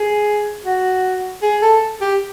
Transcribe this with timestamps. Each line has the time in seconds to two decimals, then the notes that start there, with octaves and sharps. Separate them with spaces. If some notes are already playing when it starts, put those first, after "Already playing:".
Already playing: G#4
0.64 F#4
1.42 G#4
1.62 A4
2.01 G4